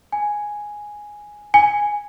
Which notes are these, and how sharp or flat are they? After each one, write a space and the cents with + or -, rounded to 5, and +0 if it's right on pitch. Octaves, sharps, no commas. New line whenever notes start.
G#5 +0
G#5 -5